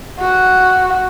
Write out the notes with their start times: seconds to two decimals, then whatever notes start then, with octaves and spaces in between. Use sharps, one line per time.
0.20 F#4